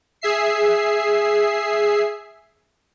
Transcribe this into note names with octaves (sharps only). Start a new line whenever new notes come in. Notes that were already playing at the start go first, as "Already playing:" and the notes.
G#4 E5 C7